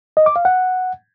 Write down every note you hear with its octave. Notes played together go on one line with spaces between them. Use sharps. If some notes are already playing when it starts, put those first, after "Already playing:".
D#5
D6
F5
F#5